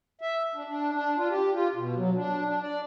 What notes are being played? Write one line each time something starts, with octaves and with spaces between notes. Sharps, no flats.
E5
D4
D4
D4
F4
G4
F4
B2
F#3
D4
D4
D5